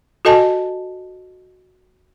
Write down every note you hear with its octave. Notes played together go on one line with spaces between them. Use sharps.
F#4 A4 D#5 G#5 A5